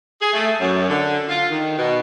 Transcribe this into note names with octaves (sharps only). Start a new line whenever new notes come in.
G#4
A3
F#2
D3
F4
D#3
B2